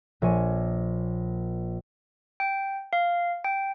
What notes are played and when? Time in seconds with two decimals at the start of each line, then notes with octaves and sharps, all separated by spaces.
0.22 A#1 C#5 G#5
2.40 G5
2.93 F5
3.44 G5